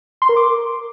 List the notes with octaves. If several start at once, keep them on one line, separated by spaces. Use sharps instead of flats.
C6
A#4
D6